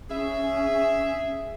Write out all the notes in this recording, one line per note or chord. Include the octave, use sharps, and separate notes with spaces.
C#4 G#4 E5